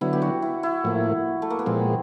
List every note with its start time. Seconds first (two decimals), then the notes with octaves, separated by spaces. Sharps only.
0.01 D3 F#3 B3 E4
0.13 G4
0.22 F#4
0.42 E4
0.63 E4
0.84 A2 F3 A#3
1.42 A3
1.50 A#3
1.59 B3
1.66 A#2 F3 G#3 C4